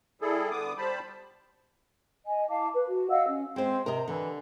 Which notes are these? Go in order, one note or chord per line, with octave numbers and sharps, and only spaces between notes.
G3 E4 G#4 A4
D3 B3 D6 D#6
G3 C5 A5 B5
D#5 G#5
E4 F5 A5 D6
B4
F#4
D#5 F5 F#5 E6
C#4
G#3 C4 C5
C3 A#4 D#5
D3 E3